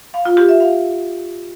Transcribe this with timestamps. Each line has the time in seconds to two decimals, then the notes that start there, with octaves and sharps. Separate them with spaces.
0.14 F5
0.25 F4
0.37 G4
0.49 E5
0.60 F5